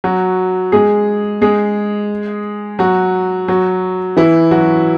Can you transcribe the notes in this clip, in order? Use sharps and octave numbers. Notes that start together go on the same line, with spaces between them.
F#3 F#4
G#3 G#4
G#3 G#4
F#3 F#4
F#3 F#4
E3 E4
F#3 F#4